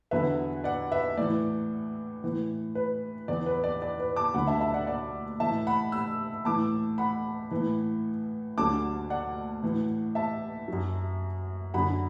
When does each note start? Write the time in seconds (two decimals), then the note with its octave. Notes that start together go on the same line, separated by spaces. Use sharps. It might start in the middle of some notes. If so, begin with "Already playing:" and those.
0.11 E2 D3 F#3 B4 E5
0.64 D5 F#5
0.91 B4 E5
1.17 A2 E3 D5
2.24 A2 E3
2.75 B4
3.28 E2 E3 D5
3.46 B4
3.64 D5
3.82 D5
4.00 B4
4.16 A5 D6
4.34 D2 D3 F#3 F#5 B5
4.47 E5 A5
4.60 E5 A5
4.74 D5 F#5
4.87 D5 F#5
5.40 A2 E3 E5 A5
5.67 F#5 B5
5.92 B5 E6
6.45 A2 E3 A5 D6
6.98 F#5 B5
7.51 A2 E3
8.58 D2 D3 F#3 A5 D6
9.10 D5 F#5
9.63 A2 E3
10.15 E5 A5
10.68 F#2 F#3
11.74 F#2 D3 F#3 F#5 B5